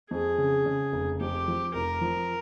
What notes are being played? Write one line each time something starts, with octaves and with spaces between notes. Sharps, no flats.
F2 G#4
C#3
C#3
F1
F2 G4
F3
F1 A#4
F3